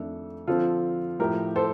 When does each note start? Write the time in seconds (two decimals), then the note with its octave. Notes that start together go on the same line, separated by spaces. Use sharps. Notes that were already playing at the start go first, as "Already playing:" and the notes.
Already playing: F2 D#3 A3 D4 A4
0.47 D3 F3 C4 F4 A4
1.19 A2 F3 A3 G4 A#4
1.56 A4 C5